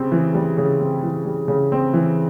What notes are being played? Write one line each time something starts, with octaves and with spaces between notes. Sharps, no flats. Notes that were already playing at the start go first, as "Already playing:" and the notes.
Already playing: C#3 G3 C4
E3
G3
C#3
C4
E3
G3
C#3
C4
E3